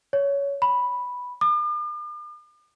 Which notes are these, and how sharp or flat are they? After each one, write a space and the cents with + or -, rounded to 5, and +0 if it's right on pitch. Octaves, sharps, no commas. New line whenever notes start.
C#5 +15
B5 -5
D6 +45